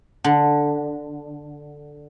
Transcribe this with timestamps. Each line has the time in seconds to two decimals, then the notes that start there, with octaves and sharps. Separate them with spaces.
0.24 D3